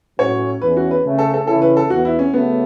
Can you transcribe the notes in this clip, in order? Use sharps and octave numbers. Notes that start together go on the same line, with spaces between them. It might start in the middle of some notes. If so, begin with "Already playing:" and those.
A2 F#3 C#4 C#5
E2 E3 C#4 B4
F#4
B4
C#3 A3 C#4
A4
A4
C#3 E3 C#4 E4 A4
B4
A4
E2 E3 B3 F#4
E4
C#4
C#3 F#3 A3 B3